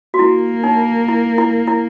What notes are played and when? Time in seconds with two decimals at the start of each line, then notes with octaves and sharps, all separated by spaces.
0.14 F#4
0.19 A#3 E4
0.64 D#4
1.08 E4
1.38 E4
1.67 E4